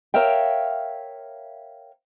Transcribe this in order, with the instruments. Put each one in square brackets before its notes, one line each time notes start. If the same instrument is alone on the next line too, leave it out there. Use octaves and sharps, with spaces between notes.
[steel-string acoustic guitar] A#4 C#5 E5 F5 G5